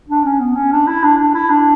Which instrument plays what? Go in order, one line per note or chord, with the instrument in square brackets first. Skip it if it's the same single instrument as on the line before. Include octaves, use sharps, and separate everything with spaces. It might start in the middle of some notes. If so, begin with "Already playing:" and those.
[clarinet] D4
C#4
B3
C#4
D4
E4
D4
D4
E4
D4